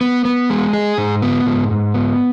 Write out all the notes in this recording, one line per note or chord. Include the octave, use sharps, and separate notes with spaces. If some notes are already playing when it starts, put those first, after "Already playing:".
B3
B3
G#3
G#4
G#2
B3
G#2
G#2
B3